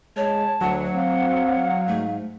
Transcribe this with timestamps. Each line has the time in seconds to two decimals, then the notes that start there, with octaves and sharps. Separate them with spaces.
0.17 G#3 C#5 A5
0.61 D2 F#3 F#5
0.96 C4 F5
1.87 G#2 A3